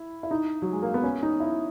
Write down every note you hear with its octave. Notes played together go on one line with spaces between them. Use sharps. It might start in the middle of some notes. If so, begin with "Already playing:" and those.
Already playing: E4
E4
D#4
F#3
G#3
A#3
B3
C#4
D#4
E4